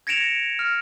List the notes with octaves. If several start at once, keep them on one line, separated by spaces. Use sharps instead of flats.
G#6 A#6 C#7 D7 E7 F7
F6